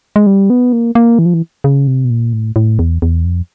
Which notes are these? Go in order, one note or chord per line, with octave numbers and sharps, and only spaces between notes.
G#3
G3
B3
A#3
A#3
E3
F3
E3
C#3
C3
B2
A#2
A2
A2
E2
E2
F2